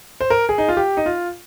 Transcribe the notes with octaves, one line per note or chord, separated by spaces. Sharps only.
C5
A#4
G#4
D#4
F4
G4
D#4
F4